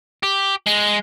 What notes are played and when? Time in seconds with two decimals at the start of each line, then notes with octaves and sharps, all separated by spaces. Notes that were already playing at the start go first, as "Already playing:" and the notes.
0.23 G4
0.67 G#3